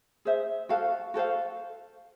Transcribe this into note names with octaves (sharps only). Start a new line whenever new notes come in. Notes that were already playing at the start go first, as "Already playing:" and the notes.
G#4 C5 E5
F#4 A4 C5 F5
F#4 A4 C5 F5